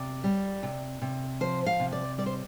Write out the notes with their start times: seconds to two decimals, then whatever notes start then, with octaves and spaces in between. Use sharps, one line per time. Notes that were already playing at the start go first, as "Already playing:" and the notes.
Already playing: C3 D5
0.24 G3
0.63 C3
1.02 C3
1.40 F3 C5
1.66 F5
1.80 C3
1.92 D5
2.18 G3 D5
2.26 C5